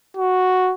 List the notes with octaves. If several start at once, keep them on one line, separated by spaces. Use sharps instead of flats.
F#4